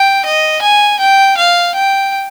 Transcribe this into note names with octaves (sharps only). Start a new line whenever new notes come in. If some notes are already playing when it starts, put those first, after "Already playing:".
Already playing: G5
D#5
G#5
G5
F5
G5